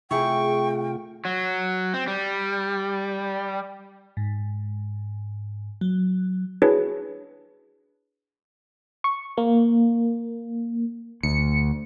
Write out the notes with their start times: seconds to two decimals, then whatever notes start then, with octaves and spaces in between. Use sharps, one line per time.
0.11 C3 A3 E4 F4 G#4 G5 C#6
1.25 F#3
1.94 C4
2.08 G3
4.17 G#2
5.81 F#3
6.62 D4 E4 F#4 G#4 B4 C#5
9.04 C#6
9.38 A#3
11.23 D2 C#7